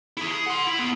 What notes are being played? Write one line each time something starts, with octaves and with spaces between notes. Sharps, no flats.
E4 G#4
G#4
F#5 C6
E4
B3 G#4